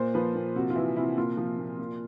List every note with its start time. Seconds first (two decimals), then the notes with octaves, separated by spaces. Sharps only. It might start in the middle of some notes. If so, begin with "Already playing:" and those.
Already playing: A#2 C5
0.14 F3 B4
0.35 A#2
0.56 C3 F#4
0.70 F4
0.75 E3 E4
0.96 C3 E4
1.17 A#2 F4
1.37 F3
1.59 A#2
1.79 A#2